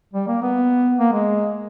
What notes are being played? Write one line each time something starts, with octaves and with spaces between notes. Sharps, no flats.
G3
A#3
B3
A#3
G#3